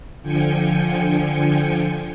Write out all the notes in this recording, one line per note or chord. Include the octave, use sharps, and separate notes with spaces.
D3 F3 G5 G#5 C#7